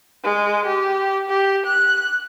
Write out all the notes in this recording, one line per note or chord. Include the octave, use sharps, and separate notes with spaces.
G#3
G4
G4
F#6